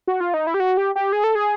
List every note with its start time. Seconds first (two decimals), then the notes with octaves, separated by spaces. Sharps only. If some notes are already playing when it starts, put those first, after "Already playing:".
0.08 F#4
0.20 F4
0.34 D#4
0.47 E4
0.54 G4
0.60 F#4
0.77 G4
0.96 G4
1.12 G#4
1.24 A4
1.35 G#4